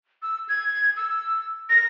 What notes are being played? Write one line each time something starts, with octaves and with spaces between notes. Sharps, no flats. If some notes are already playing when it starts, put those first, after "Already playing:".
E6
G#6
E6
A#6